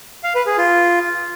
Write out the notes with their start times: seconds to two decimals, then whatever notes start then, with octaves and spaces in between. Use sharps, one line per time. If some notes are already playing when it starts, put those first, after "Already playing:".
0.24 F5
0.35 B4
0.46 G#4
0.58 F4